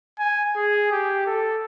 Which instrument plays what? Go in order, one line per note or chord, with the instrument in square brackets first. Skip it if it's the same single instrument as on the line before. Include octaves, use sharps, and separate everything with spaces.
[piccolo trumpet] G#5
G#4
G4
A4